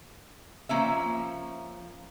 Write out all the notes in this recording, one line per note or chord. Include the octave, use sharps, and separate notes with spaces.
F3 A#3 C#4 E5